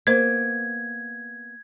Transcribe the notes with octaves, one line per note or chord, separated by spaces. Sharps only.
A#3 B3 C5 D#5 G#6